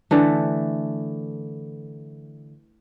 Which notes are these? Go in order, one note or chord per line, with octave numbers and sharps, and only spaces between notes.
D3 E3 A3